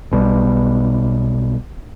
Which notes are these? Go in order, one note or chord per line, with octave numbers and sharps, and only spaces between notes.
B1 B2 G3